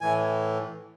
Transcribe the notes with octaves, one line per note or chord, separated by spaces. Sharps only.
A2 E3 G#5